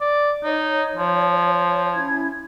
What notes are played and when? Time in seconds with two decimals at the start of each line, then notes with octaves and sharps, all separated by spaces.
0.01 D5
0.44 D#4 C#5
0.96 F3
1.94 C#4 E4 G#6